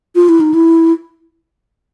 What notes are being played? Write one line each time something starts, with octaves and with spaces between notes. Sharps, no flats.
F4
E4
D#4
E4